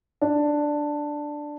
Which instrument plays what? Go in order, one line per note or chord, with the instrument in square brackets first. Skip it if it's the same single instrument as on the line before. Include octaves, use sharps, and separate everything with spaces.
[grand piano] D4